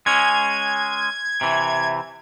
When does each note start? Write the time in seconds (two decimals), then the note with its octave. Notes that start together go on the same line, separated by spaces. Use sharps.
0.06 G#3 C#4 G#6
1.41 C3 E3